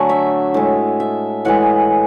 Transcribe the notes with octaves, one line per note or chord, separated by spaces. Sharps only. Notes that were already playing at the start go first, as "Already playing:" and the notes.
Already playing: D3 F#3 A3 F#5 G#5
E5
A2 G#3
E5
A2 E3 G#3 F#5